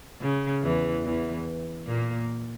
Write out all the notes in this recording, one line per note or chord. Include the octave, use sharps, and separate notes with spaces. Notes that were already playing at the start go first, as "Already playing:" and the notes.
C#3
E2 E3
E2 E3
A#2 A#3